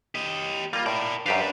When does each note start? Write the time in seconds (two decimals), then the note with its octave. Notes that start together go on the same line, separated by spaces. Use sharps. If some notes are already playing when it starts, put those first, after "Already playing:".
0.15 G4 D#5
0.73 G3 A#3 F4
0.86 A2 A#4 D5
1.26 F#2 D4 G4 B4 F5